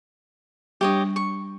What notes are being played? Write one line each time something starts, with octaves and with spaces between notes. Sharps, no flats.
G3 D4 G4 C#5 D#5
C#6